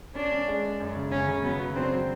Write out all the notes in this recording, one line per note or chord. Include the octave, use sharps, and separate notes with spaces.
C#4 D4
C#4
G#3
C#4
F#2
C#3
C#3 C#4
C#3
F#3 B3
F#3
C4 D4
F#3